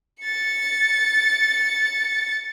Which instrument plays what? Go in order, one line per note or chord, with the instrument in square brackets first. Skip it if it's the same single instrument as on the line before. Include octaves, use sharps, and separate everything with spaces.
[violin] A6 C#7